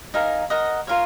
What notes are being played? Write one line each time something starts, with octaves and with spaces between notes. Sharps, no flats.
D#4 A#4 F5 G#5
A#4 D#5 F#5
F4 A#4 C#5 F5